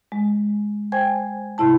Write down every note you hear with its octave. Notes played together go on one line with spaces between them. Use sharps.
G#3
C5 G5 G#5 G#6
G#2 C3 E4 A5